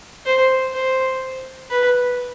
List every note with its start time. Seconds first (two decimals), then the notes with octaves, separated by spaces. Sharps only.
0.26 C5
0.74 C5
1.71 B4